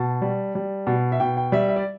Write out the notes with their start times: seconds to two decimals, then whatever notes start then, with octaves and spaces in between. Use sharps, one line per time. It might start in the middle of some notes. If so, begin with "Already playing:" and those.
Already playing: B2 A5
0.22 G3
0.55 G3
0.87 B2
1.12 E5
1.20 B2 G5
1.37 G5
1.52 G3 E5
1.69 E5
1.76 D5